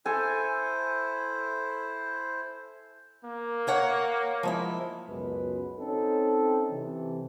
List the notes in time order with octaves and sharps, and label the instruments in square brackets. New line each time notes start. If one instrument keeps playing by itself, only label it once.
[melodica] E4 C5 [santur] A4 G#5
[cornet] A#3
[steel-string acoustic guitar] A#4 C#5 F#5
F3 G#3 E4
[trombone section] C#2 F#2 B2 G#3 B4
C4 C#4 D#4 A4
C3 E3